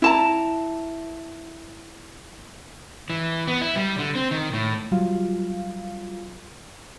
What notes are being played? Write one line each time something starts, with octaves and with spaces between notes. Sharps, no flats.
E4 A5 A#5
E3
B3
E4
G3
D3
C4
D#3
A2
F#3 G3 F4 F5